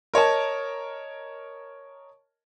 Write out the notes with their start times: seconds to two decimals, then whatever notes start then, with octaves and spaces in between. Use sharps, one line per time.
0.14 A#4 C#5 D#5 A5